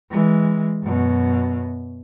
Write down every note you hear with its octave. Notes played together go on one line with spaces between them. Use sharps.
E3 G#3
F#2 B2